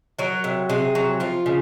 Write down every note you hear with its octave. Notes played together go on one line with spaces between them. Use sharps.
F#3 A#4
C3
C3 G#4
F#3
F3 F4
C#3